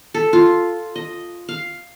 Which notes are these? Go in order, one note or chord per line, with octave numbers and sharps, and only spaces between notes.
A4
F4
D#5
F5